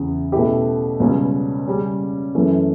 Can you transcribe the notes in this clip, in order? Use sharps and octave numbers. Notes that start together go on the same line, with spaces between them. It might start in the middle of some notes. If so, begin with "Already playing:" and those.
Already playing: E2 C#3
B2 A3 C#4 E4 G4
C#2 B2 G3 C#4
C#3 G3 C#4
F#2 E3 A3 C#4